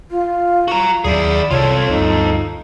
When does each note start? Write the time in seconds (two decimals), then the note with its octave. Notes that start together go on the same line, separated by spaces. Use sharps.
0.11 F4
0.68 F#4 A#5
1.04 D#2 F#3 E4 G#4 D5
1.50 C2 F4 A4 C#5
1.89 D2 G2 D#4